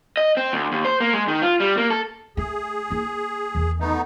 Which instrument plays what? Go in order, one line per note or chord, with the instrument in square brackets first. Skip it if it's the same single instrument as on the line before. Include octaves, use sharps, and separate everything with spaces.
[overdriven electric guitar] D#5
C4
D2
D#2
C5
A#3
G#3
D#3
F4
G3
A#3
A4
[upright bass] A3 [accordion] G#4
[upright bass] A#3 E4
E2 D#3
[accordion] A3 B3 D#4